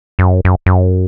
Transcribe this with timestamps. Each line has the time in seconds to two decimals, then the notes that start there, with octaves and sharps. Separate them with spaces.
0.19 F#2
0.45 F#2
0.66 F#2